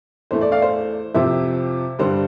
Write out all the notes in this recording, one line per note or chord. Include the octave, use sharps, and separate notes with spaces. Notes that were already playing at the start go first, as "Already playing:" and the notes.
E2 E3 A3 C5
D5
D5 F5
C5
F2 C3 F3 C4 C5 E5
G2 D3 G3 C5